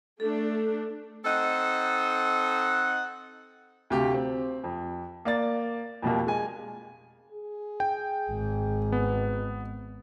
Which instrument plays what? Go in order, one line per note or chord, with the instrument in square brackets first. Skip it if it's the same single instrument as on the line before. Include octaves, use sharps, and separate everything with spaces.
[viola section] A3 D4 [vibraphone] A4
[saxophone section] C4 D#4 A4 D#5 F#5
[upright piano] D2 C3 G4 F5
C4
F2
A#3 D5 A6
F2 B2 G3 A#3
G#3 G#5
[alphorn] G#4
[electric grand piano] G5
[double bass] G#1
[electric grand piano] B3